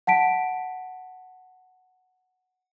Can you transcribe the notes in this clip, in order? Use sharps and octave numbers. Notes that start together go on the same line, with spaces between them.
F#5 A5 B6 D7